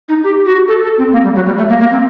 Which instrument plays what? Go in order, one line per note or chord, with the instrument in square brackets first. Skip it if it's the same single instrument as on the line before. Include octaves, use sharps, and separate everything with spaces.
[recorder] D#4
G4
F#4
A4
A4
C4
A#3
G3
F#3
G3
A3
A#3
A#3
C4